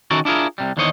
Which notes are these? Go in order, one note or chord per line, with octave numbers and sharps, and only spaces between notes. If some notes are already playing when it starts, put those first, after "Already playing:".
D#3 C#4 E4 F#4 A4 A#4
D4 E4 F4 G#4 A#4
C2 C3 G3
E2 D3 D#3 C5 C#5 D#5